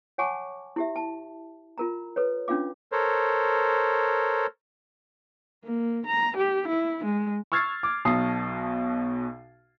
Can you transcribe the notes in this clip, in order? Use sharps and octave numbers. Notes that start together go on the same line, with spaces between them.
C#5 F#5 G#5 A5 C#6 D6
E4 G4 E5
A5
F4 A#4 A#5
A4 B4 C#5
C#4 D4 F4 F5 D6
A4 A#4 C5 C#5
A#3
A#5
G4
E4
G#3
C#6 E6 F6 G#6 A6 C7
D6
B1 B2 A5 D#6 C7